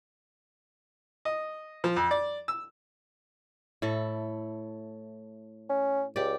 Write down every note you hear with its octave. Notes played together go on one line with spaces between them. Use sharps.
D#5
F3
F2
D5
E6
A2 E4 A4
C#4
C#2 G4 D5